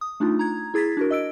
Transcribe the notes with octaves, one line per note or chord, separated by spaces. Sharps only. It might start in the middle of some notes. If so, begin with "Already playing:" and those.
D#6
A3 D4 D#4 F4
A#5 G#6
E4 G#4 G#6 A6 B6
D4 F#4 A#4
D#5 E6 D7